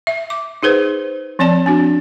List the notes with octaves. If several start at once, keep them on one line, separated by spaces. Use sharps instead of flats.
E5
D6
D#4 G#4 B4 C5
F3 C4 D5 A5
C4 D4 F#4